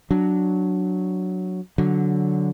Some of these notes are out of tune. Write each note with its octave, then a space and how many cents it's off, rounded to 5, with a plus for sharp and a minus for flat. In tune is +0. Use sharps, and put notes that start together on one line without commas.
F#3 +0 D4 +0
D3 -10 F#3 +0